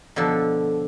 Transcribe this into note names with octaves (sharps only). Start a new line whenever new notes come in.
B2 D3 F3 A4